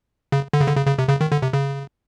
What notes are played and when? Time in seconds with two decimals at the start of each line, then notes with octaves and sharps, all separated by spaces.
0.32 C#3
0.53 D3
0.61 C#3
0.68 D3
0.76 C#3
0.87 C#3
0.99 C3
1.09 C#3
1.21 D#3
1.32 D3
1.42 C3
1.53 C#3